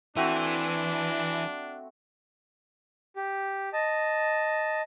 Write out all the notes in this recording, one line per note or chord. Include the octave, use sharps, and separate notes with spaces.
E3 A3 C4 D4 F#4
G4
D#5 A5